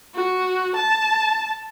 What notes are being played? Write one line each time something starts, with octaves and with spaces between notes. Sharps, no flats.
F#4
A5